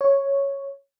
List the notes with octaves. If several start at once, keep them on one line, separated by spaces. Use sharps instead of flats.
C#5